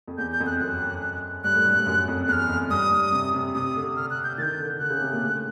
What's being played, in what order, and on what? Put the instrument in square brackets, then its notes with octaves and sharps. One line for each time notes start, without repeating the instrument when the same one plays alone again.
[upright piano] F2
[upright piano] E2 [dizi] G6
[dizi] G6
[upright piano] F2
[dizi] F#6
[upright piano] F#2 [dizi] F#6
[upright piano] G2 [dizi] F#6
[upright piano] A2
G2
G2
F#2
F2
[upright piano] E2 [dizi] F#6
[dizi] F6
[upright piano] F2
[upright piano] G2 [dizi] D#6
[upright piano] G2
C3
C3
[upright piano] C3 [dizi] D#6
[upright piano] D3
[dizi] F6
F#6
G6
[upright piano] D#3 [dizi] G6 A6
[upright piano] D3
[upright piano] D3 [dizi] F#6
[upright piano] C#3
C3
A#2
A2
A2